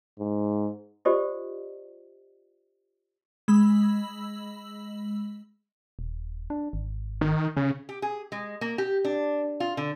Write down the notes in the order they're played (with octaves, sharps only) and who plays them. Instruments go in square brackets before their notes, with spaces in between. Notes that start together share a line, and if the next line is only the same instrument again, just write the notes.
[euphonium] G#2
[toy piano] F4 G4 A4 C5 D5 D#5
[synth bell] G#3 B5 E6
[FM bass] D#1
D4
G#1
[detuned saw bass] D#3
[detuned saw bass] C#3 [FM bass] C#4
[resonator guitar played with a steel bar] G4
G#4
G#3
A#3
G4
D4
F4
D3